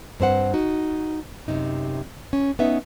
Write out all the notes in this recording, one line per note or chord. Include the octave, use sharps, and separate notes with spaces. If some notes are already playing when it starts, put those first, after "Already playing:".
G2 C4 C5 F#5
D#4 F#4
F#2 C3 D#4
C#4
B3 C#4 D#4 E5